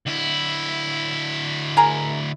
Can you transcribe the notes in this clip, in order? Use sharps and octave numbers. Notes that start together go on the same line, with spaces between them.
D2 E4
G#4 A#4 A#5